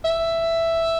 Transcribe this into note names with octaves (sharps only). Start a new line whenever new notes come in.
E5